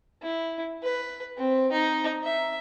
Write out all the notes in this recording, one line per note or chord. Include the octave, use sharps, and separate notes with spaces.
E4
B4
C4
D#4
E5